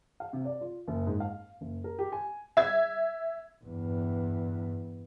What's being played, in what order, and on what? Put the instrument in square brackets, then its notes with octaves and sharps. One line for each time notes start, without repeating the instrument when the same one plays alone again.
[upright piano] F5
C3
D5
F4
F#1
G#2
F5
F#1
A#4
G4
G#5
[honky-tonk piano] E5 G#6
[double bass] E2 G2